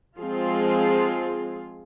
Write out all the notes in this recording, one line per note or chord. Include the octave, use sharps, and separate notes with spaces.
F3 G#3 C4 F4 G#4